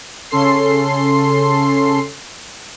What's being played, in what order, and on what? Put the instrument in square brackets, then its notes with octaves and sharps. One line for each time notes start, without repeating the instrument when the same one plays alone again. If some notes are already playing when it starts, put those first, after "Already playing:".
[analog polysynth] C#3 C#4 A4 C6 C7